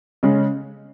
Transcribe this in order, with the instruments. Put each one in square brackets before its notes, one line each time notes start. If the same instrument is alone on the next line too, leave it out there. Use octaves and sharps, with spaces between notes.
[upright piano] C#3 G#3 C#4